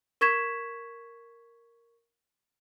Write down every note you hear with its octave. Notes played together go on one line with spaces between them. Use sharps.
A#4 C#6 G#6 B6 E7